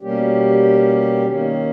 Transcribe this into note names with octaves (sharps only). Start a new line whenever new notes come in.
B2 G3 A#3 C#4 G4
D#3 A#3 C#4